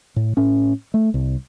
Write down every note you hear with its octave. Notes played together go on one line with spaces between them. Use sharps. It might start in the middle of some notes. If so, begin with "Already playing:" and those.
A2
A2 C#4
A3
C2